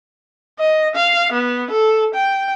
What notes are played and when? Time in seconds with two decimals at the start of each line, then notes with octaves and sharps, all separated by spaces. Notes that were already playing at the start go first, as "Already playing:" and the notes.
0.60 D#5
0.96 F5
1.33 B3
1.71 A4
2.15 G5